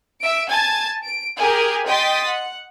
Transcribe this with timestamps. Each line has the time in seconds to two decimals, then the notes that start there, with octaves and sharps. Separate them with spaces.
0.21 E5 D7
0.50 G#5 A5 G#6 A6
1.04 D7
1.36 G4 G#4 A#4 G#5
1.86 D#5 G5 C6 D#6 A6 B6
2.27 F#5